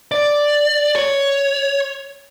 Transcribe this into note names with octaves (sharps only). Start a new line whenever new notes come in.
D5
C#5